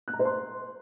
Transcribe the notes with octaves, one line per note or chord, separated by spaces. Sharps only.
F#6
A#5
C5
C6